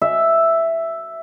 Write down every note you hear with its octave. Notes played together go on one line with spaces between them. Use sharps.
E5